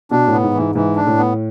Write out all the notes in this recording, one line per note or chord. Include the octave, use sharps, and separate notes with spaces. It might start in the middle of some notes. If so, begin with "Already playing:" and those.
B2 D4
A2 B3
G#2
E3
G#2
G#2 E3
D4
A2
B3